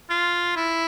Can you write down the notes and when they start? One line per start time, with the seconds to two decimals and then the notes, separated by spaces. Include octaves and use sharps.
0.10 F4
0.56 E4